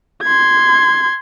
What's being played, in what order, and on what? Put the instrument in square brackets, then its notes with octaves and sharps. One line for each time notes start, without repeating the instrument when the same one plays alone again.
[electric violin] C6 G#6